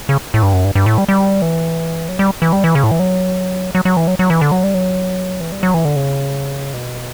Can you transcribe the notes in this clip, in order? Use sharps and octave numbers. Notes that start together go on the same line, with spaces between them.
C#3
A2
G2
F#2
G2
G2
A2
G3
G3
E3
F#3
G3
E3
G3
E3
C#3
A2
E3
F#3
F#3
F#3
E3
F#3
F#3
E3
D3
F#3
G3
F#3
E3
G3
F#3
E3
D3
C#3
B2